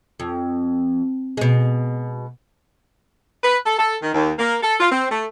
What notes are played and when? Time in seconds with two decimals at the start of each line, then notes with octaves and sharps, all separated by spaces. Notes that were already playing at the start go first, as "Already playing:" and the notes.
0.20 F2
1.37 B2 G#3
3.43 B4
3.66 A4
3.78 A4
4.02 D#3
4.14 D#2
4.38 A#3
4.63 A4
4.79 F4
4.92 C4
5.10 A3